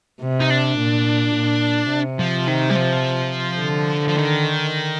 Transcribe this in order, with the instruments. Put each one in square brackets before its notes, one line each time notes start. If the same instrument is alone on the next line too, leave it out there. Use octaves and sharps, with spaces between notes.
[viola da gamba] C3
[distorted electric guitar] D#4
D4
[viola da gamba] A#2
A#2
C3
[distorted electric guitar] F3
D#3
G3
F3
[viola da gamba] D3
[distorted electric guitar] F3
D#3